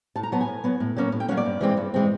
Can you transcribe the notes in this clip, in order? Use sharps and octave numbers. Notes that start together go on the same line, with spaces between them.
A2 A5
A#5
F#3 B3 A5
G#5
A2
F#3 B3
A2
F#3 A#3 C#4
A2
G5
F#3 A#3 C#4 F#5
D5
G2
E3 G#3 C4
G2
E3 G#3 C4